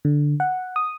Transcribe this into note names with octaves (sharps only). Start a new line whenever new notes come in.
D3
F#5
D#6